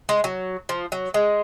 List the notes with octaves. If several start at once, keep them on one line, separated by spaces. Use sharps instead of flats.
G#3
F#3
F3
F#3
G#3